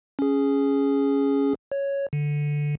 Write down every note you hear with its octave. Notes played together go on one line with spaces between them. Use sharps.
C#4 G#4
C#5
D3